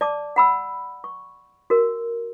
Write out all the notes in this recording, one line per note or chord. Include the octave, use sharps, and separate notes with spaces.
D5 A5 D6
F#5 B5 E6
C#6
F#4 A#4